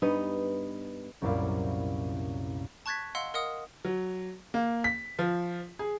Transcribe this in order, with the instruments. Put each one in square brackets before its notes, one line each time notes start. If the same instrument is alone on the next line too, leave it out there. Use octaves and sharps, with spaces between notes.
[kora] G2 B3 D#4
[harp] C2 F#2 A#2 E4 D5 F5
[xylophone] A5 C#6 F#6 G#6 A6 B6
D#5 F5 F#5 C6 E6
A#4 D#5 F5 F#5 D#6
[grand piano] F#3
A#3
B6
F3
G#4